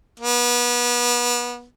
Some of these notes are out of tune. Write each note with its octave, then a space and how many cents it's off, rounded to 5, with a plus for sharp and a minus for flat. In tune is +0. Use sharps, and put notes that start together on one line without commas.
B3 -30